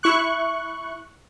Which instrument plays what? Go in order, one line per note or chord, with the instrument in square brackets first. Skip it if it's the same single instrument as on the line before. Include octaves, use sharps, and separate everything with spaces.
[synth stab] E4 C#6 F#6